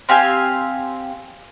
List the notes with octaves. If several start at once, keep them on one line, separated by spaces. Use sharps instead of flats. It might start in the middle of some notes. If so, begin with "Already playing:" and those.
C4 G4 F5 G#5